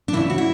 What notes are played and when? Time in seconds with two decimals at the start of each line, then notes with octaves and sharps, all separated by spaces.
0.08 D4
0.13 D2 C#3 E3 E4
0.30 F#4
0.38 E4